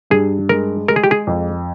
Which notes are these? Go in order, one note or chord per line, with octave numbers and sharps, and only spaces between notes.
G2 G#4
G#3 A#4
G#3 A#4
G#4
G4
G#4
F2